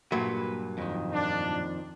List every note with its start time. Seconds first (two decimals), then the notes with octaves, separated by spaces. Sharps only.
0.12 G2 A#2 F#3 B4
0.78 F2 D#3
1.12 D4